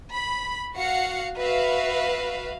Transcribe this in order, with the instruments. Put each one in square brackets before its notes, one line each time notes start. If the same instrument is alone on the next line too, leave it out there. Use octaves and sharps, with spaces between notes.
[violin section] B5
F#4 F5 F#5 C#7
F#4 B4 E5 F5